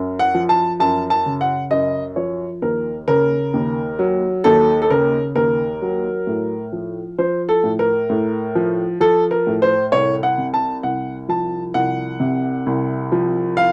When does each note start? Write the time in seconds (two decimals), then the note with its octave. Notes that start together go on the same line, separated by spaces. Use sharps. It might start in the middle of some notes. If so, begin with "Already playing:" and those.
Already playing: F#2
0.19 F#5
0.34 F3
0.49 A5
0.79 F#2 A5
1.10 A5
1.26 C#3
1.41 F#5
1.70 F#2 D#5
2.16 F3 C#5
2.62 D#2 A#4
3.08 C#3 A#4
3.54 D#2
3.99 F#3
4.44 D#2 A4
4.82 A4
4.90 C#3 A#4
5.35 D#2 A#4
5.82 F#3
6.27 A2
6.73 F3
7.18 F3 C5
7.49 A4
7.63 A2
7.79 A#4
8.09 A2
8.55 F3
9.00 F3 A4
9.31 A#4
9.47 A2
9.62 C5
9.92 C2 C#5
10.23 F#5
10.38 C3
10.54 A5
10.83 C2 F#5
11.29 F3 A5
11.74 C2 F#5
12.20 C3
12.66 C2
13.12 F3
13.57 F5